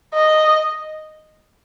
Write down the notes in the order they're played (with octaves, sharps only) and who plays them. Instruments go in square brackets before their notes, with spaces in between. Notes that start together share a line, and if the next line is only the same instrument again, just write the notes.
[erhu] D#5